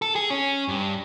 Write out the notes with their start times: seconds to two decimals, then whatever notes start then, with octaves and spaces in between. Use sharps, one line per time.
0.02 A4
0.16 G#4
0.30 C#4
0.68 G2